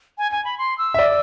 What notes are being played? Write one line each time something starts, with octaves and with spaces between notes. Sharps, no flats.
G#5
G#5
B5
C6
E6
E5
D5